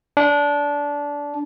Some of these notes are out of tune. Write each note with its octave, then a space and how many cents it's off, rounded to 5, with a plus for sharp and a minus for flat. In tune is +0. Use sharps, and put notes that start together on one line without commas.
D4 -20